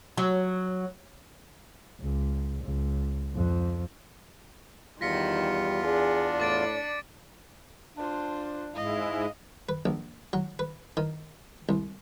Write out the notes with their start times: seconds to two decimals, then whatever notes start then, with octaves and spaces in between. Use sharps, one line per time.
0.17 F#3
2.00 C#2
2.63 C#2
3.35 F2
5.01 E2 D#3 G3 F4 A#6 B6 C#7
5.84 D4 G#4
6.40 A2 D6 A6 D7
7.97 D4 F4 C5
8.74 G#2 G#3 E4 D#5 F5
9.69 B4
9.86 A#1
10.33 F#3
10.59 B4
10.97 D#3
11.69 C2